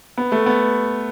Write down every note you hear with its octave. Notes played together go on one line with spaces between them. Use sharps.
B3
A3
B3